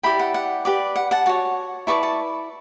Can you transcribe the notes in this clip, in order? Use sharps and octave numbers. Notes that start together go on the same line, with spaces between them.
E4 G4 D5 G5 B5
F#5
F#5
G4 B4 D5
F#5
F#5 A5
F#4 C#5 A5 C#6
E4 B4 D5 A5 C#6
A5 C#6